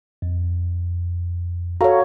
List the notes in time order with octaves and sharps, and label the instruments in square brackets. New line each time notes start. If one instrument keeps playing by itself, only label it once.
[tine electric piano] F2
[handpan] F#4 C#5 [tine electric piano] A4 F5 A#5